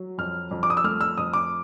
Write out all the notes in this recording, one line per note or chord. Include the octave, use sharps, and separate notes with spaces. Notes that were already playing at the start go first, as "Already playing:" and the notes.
Already playing: F#3
F2 F6
F2
D6
D#6
E6
A3 F6
E6
F2 D#6
D6